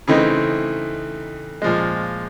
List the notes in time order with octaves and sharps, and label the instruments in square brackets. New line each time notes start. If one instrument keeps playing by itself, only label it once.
[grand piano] C#3 E3 A3 C4 D#4
A#2 F3 G#3